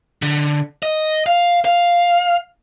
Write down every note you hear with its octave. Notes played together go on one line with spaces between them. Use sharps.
D3
D#5
F5
F5